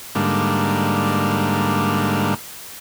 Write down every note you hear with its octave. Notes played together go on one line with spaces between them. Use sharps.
G#2 D3 G3 A#3